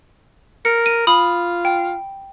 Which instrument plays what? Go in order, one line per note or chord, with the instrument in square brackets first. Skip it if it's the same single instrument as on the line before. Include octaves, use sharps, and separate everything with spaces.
[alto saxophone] A#4 [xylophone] C#7
[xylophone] D#7
[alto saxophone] F4 [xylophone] B5 D#6
[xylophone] G5